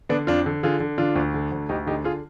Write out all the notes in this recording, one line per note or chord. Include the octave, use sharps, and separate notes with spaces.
D3 B3 D4
F2 D4 F4
D3
D3 F4 G#4
D3
D3 D4 F4
D2
D3
D2
D2 D#4 G4
D3 D#4 G4
F4 G#4